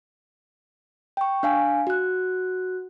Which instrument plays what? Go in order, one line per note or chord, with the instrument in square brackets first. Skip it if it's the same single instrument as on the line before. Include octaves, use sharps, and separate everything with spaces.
[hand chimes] G5 C#6
D4 F5 G#5
F#4 F#6